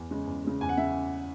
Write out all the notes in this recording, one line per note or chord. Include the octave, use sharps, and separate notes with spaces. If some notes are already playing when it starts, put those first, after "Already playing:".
Already playing: E2
C#3 G#3
E2
C#3 G#3
E2 G#5
F#5
C#3 E5